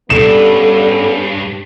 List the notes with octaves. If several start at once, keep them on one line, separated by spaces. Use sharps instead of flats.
E2 G2 G3 B3 C#4 A4 E7